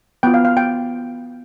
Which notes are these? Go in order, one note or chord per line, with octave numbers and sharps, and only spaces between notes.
B3 F4 G5
F5
F5
G5